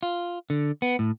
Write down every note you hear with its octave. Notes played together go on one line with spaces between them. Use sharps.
F4
D3
B3
A2